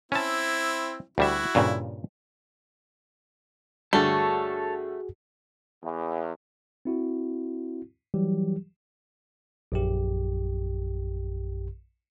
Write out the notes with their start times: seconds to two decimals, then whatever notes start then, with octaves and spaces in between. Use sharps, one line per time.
0.12 C4 C#4 E4 A5
1.18 D2 G3 E4 F#4 E5
1.55 G2 A#2 C#3
3.93 G2 D3 A3 F#4 G#4 A4 C#5 A5
5.83 E2
6.85 C4 E4 F#4
8.14 E3 F#3 G3 G4
9.72 A#1 F#2 G4